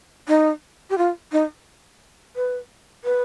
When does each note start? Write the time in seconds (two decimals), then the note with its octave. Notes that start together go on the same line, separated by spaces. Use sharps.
0.28 D#4
0.90 G4
0.98 F4
1.32 D#4
2.36 B4
3.04 B4